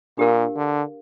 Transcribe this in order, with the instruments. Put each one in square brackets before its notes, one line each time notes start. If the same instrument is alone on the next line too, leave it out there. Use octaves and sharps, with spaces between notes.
[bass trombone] A#2 [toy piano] D4 G4 A#4 F5
[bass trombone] D3